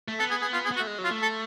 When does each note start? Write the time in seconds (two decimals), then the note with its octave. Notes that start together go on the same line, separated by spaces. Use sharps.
0.08 A3
0.19 B3 A4
0.30 G#4
0.41 G#4
0.53 F4
0.65 G#4
0.71 B3
0.76 F#4
0.80 A3
0.87 G#3
0.98 F#3
1.04 F4
1.11 A3
1.22 A4